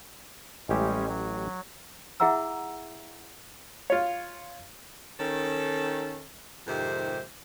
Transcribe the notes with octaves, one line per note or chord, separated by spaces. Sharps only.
A1 G3 G#3 C#4 G4 E5
F#3
E4 G#4 E5 F#5 A#5 E6
F4 C#5
D#3 C#4 A4
F2 G#2 C3 D#3 G4 C5